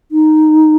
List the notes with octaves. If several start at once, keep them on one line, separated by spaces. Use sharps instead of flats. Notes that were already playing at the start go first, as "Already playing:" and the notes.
D#4